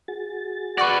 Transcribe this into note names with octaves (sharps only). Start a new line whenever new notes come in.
F#4 G#4 A6
B4 D5 F#5 C#6 F#6 A#6